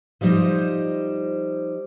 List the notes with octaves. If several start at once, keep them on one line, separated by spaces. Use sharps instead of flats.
F3 G3 D#4 C5 D#5